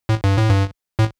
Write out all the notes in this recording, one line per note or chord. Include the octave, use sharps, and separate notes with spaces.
A2
G2
A2
G2
A2